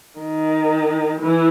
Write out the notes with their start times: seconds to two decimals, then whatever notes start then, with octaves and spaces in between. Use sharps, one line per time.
0.19 D#3
1.20 E3